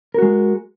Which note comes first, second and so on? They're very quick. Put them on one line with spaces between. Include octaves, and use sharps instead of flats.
A#4 F#4 G#3